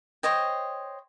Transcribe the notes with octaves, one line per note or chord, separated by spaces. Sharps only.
C5 C#5 D#5 G5